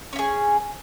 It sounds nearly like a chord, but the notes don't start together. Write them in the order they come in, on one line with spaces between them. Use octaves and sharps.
C#4 E4 G#4